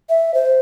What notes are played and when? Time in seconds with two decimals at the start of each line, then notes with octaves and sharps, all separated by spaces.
0.09 E5
0.34 C5